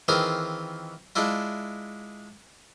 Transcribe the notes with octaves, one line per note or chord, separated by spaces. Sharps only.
D#3 E3 C4 F4 G#4 F5
G#3 D4 E4 F4